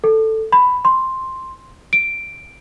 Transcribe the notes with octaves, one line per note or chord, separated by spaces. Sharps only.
A4
B5
C6
D7